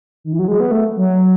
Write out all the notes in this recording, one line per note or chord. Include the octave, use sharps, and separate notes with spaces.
D#3
E3
F#3
G#3
B3
A3
F#3